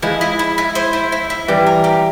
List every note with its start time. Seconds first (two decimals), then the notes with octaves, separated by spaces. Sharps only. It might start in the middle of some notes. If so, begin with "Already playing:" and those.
0.02 F3 G#3 E4
0.21 E4
0.39 E4
0.58 E4
0.75 C5
0.93 E4
1.12 E4
1.30 E4
1.48 E3 G3 G4
1.67 A#4
1.84 G4